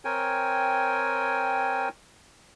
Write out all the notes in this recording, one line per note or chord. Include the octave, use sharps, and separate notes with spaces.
C4 A#4 C#5 G5 G#5